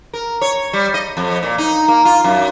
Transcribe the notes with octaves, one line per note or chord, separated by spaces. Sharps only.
A#4
C#5
G3
D#5
F2
A#2
D#4
A#3
F4
F#2